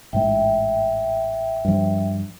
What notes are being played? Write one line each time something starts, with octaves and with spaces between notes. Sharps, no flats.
A1 G#2 G#3 E5 G5
G2 F3